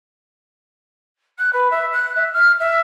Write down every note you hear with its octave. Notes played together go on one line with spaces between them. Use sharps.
F#6
B4
E5
F#6
E5
F6
E5